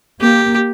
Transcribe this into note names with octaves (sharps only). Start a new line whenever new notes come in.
A#3 G4